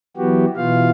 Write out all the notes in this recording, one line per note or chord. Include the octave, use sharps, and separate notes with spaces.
E3 F#3 B3 F#4 G4
B2 E3 F4 F5